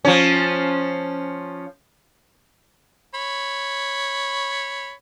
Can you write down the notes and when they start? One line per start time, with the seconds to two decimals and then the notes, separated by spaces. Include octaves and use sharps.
0.05 F3 C#4
3.14 C#5 B5